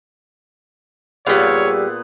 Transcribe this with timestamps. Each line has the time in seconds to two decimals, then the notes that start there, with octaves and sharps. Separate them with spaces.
1.27 A#2 G3 B3 G#4 C#5 F5 E6